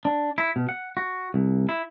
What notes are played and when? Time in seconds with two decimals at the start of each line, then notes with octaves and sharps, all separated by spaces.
0.05 D4
0.38 E4
0.56 B2
0.69 F#5
0.97 F#4
1.34 C2
1.69 E4